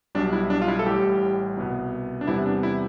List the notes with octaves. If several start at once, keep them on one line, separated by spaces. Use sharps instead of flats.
B1 B2 G3 D4
E4
D4
F4
E4
A4
A1 A2 G3 G4
C2 B2 B3
D4
E2 C3 G3 B3 E4
D4
E4